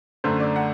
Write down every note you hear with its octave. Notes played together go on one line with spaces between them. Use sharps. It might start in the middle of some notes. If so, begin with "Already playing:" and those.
F#2 D3 A3 C5
D5
F#5